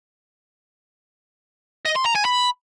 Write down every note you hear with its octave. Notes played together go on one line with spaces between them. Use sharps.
D#5
C6
A#5
G#5
B5